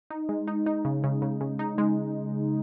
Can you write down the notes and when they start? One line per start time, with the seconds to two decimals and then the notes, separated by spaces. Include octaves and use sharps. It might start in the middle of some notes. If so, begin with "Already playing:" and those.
0.10 D#4
0.29 G#3
0.47 D#4
0.66 D#4
0.85 C#3
1.04 C#3
1.22 C#3
1.41 C#3
1.59 D#4
1.78 G#3